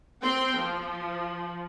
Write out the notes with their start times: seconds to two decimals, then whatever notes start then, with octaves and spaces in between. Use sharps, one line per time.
0.21 C4 G5 C6
0.57 F3